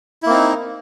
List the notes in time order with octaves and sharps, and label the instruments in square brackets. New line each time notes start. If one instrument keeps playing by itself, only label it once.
[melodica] E4
A#3
C4
D#4